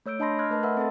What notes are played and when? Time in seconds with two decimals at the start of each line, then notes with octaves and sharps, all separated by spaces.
0.06 A3 C#5 E6 G6 D7
0.19 D4 D#5 A5 B5 C6 A#6
0.39 C6 F6 F#6 G#6
0.50 A3 A#4 B4 D#5 A5
0.63 A#4 B4 E5 F#5 B5 E6
0.77 C4 A4 A5 C6 A6